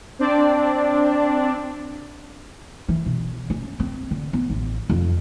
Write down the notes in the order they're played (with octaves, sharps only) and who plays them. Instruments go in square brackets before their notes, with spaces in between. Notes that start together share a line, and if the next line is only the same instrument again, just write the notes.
[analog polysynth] C4 D4 D5
[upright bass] E3
B2
C#4
C4
D3
B3
A1
F2